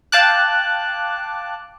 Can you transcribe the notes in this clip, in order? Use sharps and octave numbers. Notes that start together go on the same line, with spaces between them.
F5 G5 A5 D6 F#6